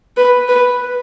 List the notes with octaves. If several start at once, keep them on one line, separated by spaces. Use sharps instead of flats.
B4
B4